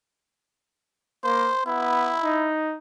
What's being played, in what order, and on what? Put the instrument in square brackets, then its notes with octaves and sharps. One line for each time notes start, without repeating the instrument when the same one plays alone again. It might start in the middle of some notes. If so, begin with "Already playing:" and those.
[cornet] A#3 [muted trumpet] C5
[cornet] B3 [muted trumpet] E4
[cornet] D#4